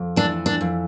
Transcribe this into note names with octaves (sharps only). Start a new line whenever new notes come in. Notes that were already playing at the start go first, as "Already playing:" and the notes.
Already playing: F2
E3 D4
D4
F2